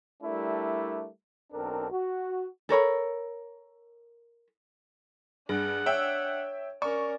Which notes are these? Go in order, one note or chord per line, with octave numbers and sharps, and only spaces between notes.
G3 A3 D4 E4 G4 A#4
B1 C4 D4 A4 A#4
F#4
A4 A#4 C#5 B5
G2 D4 G#4 F#5
C#5 E5 G5 E6
C#4 A#4 D5 C#6